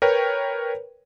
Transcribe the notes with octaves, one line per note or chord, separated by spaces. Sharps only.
A#4 B4 C#5 G5